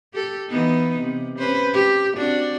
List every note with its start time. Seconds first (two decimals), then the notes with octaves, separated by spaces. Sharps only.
0.14 G4 A4
0.49 E3 B3 D#4
1.00 C3
1.38 C#4 B4 C5
1.73 G4
2.17 C4 D4 F#4